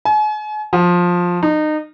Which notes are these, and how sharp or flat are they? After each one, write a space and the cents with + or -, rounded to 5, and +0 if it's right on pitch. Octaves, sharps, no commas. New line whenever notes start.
G#5 +40
F3 +15
D#4 -25